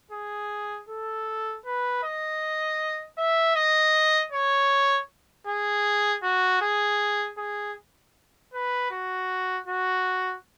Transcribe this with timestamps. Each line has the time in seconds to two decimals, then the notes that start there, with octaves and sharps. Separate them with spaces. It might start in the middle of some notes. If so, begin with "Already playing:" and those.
0.12 G#4
0.89 A4
1.66 B4
2.04 D#5
3.18 E5
3.56 D#5
4.32 C#5
5.48 G#4
6.23 F#4
6.62 G#4
7.38 G#4
8.54 B4
8.91 F#4
9.68 F#4